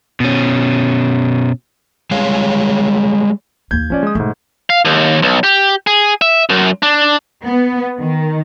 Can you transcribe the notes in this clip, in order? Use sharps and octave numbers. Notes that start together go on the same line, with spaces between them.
B2 C#4
G3 G#3 G#4 C#5 F5
D#2 A#3 G6 G#6
D#3 F3 A#3 C#4 D5
G#3 D#6
G#2 B2 D#3 A3
F5
D#2
B1
G4
G#4
E5
F#2
D4
B3
D#3